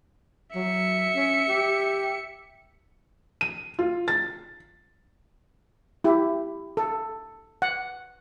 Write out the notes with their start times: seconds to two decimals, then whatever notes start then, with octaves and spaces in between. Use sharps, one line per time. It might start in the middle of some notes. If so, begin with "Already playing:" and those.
0.55 F#3 E5 C#7
1.16 C#4
1.49 G4
3.41 D#7
3.79 F4
4.08 A6
6.04 E4 G4
6.77 A4
7.62 F#5